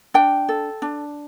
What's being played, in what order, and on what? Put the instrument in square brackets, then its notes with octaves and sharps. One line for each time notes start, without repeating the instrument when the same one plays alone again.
[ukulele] D4 G5
A4
D4